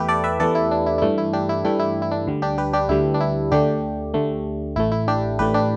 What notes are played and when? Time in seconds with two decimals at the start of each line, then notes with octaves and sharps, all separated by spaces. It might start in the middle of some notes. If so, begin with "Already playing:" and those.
Already playing: E2 E3 A3 E4 G4 B4
0.08 A4 D5
0.24 B4 E5
0.40 E2 E3 A3 A4 D5
0.55 E4
0.71 D4
0.86 E4
0.98 E4
1.02 G2 E3 A3 D4
1.18 E4
1.33 D4 G4
1.49 E4
1.64 G2 E3 A3 D4 G4
1.79 E4
2.02 E4
2.11 D4
2.27 D2 D3 G3
2.42 D4 G4
2.58 G4 B4
2.73 D4 G4
2.89 D2 D3 G3 E4
3.14 D4
3.20 E4
3.52 D2 D3 A3 D4 G4
4.14 D2 D3 A3
4.76 A1 A2 A3 E4
4.92 E4
5.08 D4 G4
5.39 A1 A2 A3 G4 B4
5.54 D4 G4